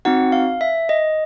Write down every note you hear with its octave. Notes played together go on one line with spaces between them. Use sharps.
C4 D#4 F#4 F#5
F5
E5
D#5